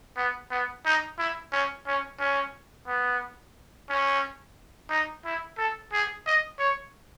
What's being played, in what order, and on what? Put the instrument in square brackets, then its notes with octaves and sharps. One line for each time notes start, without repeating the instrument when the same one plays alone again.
[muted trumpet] B3
B3
D#4
E4
C#4
C#4
C#4
B3
C#4
D#4
E4
A4
G#4
D#5
C#5